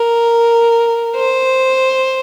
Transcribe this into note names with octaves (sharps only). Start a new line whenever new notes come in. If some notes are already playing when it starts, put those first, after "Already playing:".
Already playing: A#4
C5